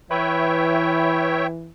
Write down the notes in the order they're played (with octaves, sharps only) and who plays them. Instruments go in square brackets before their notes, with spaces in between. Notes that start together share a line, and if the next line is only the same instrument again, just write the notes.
[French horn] E3 [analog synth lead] B4 [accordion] C#5 E5 G5